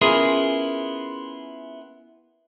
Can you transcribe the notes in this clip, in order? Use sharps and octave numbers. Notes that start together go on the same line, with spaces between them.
B3 C#4 E4 F4 G#4 A#4